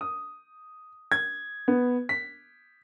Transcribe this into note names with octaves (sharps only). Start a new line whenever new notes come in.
D#6
G#6
B3
B6